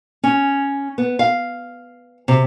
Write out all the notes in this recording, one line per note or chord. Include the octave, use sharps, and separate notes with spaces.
C#4
B3
F5
C3